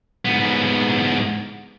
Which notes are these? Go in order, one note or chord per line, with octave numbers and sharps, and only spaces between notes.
G#2 B3